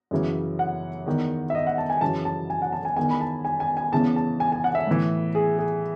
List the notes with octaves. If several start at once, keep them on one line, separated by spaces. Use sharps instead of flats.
F#2 C#3 E3
F#5
E2 D#3
E5
D#5
F#5
A5
G#5
F#2 C#3 E3 A5
A5
G#5
F#5
A5
G#5
E2 D#3 G#5
B5
A5
G#5
G#5
G#5
E2 C#3 E3 A5
A5
G#5
G#5
F#5
E5
A2 E3
G#4
G#4